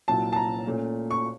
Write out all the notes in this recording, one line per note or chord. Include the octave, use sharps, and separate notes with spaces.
C2 A#2 F#3 A5
A5
A#5
A#2 A3 C#4
C#6